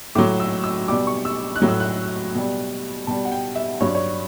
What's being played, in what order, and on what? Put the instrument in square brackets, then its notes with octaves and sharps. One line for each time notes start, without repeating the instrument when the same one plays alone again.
[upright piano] A2 F#3 D6
E6
E6
B2 G3 D6
C#6
E6
F#6
A2 F#3
E6
F#6
B2 G3
B2 G3 A5
F#5
G5
E5
G2 F#3 C#5
D5
C#5